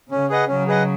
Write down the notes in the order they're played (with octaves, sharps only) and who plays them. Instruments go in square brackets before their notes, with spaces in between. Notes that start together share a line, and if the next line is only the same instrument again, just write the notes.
[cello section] C#3 [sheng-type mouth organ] C#4
[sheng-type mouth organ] G#4 B4 D#5 F#5
[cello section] C#3 F#3 [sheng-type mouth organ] C#4
[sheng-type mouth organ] G#4 B4 D#5 F#5